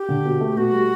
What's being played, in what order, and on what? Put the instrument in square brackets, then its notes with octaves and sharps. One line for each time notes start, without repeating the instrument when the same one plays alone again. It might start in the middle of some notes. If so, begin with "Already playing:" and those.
Already playing: [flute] G4
[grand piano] D3
B2
A3
[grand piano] B2 [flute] F#4
[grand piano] G3